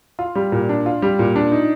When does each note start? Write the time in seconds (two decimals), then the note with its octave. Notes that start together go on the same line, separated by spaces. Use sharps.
0.19 F4
0.35 G3
0.52 A#2
0.69 D4
0.86 F4
1.02 G3
1.19 A#2
1.36 D4
1.52 D#4